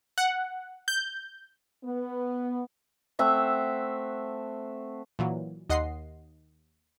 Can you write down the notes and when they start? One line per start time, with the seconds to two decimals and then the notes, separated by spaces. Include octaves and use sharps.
0.18 F#5
0.88 G6
1.84 B3
3.19 A3 C4 E5 F#5
5.19 A#2 E3 F#3
5.70 D#2 D#5 F#5 C6 C7